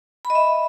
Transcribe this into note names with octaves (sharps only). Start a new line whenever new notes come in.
B5
D#5
E5